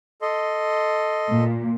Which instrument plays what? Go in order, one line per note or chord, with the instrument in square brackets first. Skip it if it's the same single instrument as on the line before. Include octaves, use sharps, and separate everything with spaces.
[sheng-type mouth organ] A4 D#5 C6
[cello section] A#2